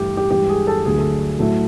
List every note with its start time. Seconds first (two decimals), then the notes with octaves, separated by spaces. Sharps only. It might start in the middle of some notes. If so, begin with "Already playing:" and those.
Already playing: G2 E3 A3 G4
0.17 G4
0.31 G2 E3 G#3 G4
0.49 G#4
0.67 A4
0.85 D2 D3 F#3 A3 G#4
0.98 A4
1.39 A2 F#3 A3